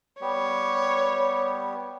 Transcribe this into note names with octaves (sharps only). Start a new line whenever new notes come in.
G3 B3 G4 C#5